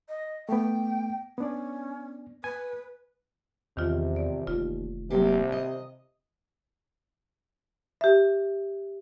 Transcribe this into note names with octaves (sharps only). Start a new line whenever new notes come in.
D#5
A3 B3 G5
B3 C#4 D4 D5
B4 G#5
E2 C3 D#3 E3 F4
D5
F1 D#2 F4
C3 F#3 A#3 G4
D#5
G4 E5